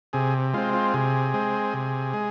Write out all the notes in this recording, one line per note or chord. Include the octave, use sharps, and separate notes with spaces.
C3 G#4
G#3 C4 F4
F4
C3 G#4
G#3 C4
C3
G#3